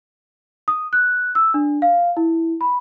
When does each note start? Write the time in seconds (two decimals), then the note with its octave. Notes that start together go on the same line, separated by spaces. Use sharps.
0.68 D#6
0.93 F#6
1.35 E6
1.54 D4
1.82 F5
2.17 E4
2.61 B5